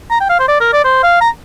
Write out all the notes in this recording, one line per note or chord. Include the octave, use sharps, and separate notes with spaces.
A#5
G5
F5
C5
D5
A#4
D5
C5
F5
A#5